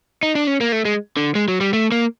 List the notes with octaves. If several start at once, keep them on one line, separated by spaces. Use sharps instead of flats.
D#4
D4
C#4
A#3
A3
G#3
D3
G#3
F#3
G3
A3
A#3